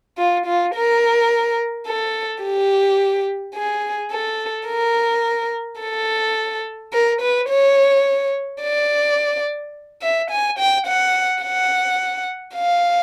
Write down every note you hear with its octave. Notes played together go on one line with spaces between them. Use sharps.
F4
F4
A#4
A4
G4
G#4
A4
A#4
A4
A#4
B4
C#5
D5
E5
G#5
G5
F#5
F#5
F5